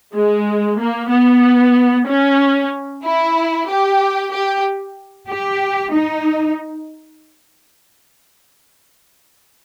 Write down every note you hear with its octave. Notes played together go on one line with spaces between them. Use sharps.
G#3
A#3
B3
C#4
E4
G4
G4
G4
D#4